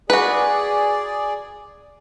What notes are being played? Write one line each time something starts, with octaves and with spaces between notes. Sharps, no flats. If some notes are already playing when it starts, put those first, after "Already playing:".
F#4 G#4 B4 D5